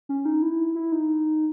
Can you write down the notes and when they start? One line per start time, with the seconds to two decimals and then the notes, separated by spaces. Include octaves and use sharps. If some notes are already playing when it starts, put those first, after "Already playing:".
0.09 C#4
0.25 D#4
0.42 E4
0.75 E4
0.92 D#4